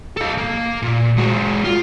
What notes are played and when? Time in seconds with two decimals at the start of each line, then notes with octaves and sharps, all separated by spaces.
0.17 A4 F5
0.38 A#3
0.82 A#2
1.17 G#3 F#4
1.64 F4